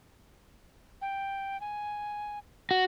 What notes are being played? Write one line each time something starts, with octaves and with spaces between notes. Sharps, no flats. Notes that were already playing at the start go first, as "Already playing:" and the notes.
G5
G#5
F#4